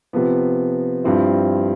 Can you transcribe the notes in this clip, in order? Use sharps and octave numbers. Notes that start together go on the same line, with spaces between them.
C3 F3 B3
G2 F3 C4 E4